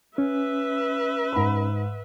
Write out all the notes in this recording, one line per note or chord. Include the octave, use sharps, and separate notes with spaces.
C#4 B4 E5
G#2 B5